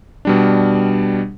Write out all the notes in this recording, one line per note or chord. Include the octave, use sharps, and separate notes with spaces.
B2 G3 D4